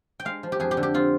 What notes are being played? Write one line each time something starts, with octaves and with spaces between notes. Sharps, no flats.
G5
G#3 F5
F3
G4
F2 G#4
G4
D3
G4
C4 F4